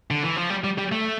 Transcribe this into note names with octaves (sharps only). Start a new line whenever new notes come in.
D3
E3
F3
G3
G3
G3
A3